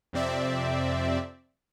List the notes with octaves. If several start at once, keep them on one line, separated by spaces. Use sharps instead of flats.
F2 C3 C4 D5 E5